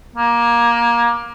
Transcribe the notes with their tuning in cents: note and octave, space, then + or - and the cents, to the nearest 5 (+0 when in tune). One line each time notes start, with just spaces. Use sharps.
A#3 +20